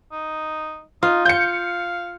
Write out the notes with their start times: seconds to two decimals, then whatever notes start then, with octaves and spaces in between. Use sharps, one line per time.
0.12 D#4
1.03 D#4 F4
1.25 F5 G6 C#7